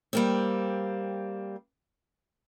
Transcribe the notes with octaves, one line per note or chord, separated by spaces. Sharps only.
G3 A#3 C4